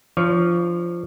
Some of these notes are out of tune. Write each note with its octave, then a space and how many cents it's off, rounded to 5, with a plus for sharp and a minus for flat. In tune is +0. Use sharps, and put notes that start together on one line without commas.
F3 -15 D4 +15 C#5 +20